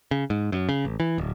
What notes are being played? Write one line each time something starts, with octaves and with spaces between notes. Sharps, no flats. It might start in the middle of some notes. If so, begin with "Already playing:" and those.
C#3
G#2
F#2
C#3
A1
E3
D1